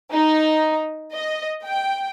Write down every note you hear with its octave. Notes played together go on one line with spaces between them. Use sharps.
D#4
D#5
G5